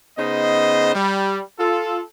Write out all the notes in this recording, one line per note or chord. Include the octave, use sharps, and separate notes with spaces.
C#3 B3 D#4 C5 D#5
G3
F4 A4